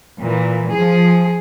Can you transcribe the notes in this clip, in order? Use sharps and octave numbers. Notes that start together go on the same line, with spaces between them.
A#2 E3
F3 G#4